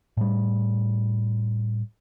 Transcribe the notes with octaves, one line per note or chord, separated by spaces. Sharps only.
A2 G3